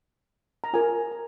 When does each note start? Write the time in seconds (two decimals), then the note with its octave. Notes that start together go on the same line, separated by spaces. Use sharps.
0.64 A#5
0.73 F4 A#4 G#5
1.12 A#5